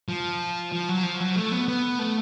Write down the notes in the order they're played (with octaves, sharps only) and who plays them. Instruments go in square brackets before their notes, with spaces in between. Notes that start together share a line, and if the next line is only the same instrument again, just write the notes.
[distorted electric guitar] F3
F3
F#3
F3
F#3
A3
B3
B3
A3